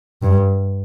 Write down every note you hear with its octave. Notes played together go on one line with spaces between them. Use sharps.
G2